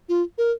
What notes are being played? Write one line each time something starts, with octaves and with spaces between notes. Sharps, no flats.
F4
A#4